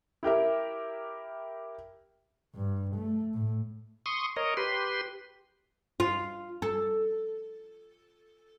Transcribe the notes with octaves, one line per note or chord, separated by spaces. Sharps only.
E4 G4 A#4 E5
G2
A3
A2
C6 C#6 D#6
A#4 C#5 D#5
G4 B4 C6
F4
A4